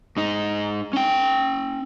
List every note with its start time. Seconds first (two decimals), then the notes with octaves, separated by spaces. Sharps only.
0.17 G#2 D#4
0.93 C#4 G5